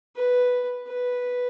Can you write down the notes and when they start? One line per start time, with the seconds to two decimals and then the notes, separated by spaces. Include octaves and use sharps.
0.16 B4
0.87 B4